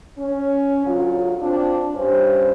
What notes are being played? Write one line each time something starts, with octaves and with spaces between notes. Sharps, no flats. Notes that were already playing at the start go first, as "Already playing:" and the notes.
C#4
D2 C#3 F#3 F4
C4 D4 F4
G2 C#4 C5